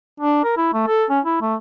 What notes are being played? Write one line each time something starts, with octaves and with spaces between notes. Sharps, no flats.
D4
A#4
E4
A3
A4
C#4
E4
A3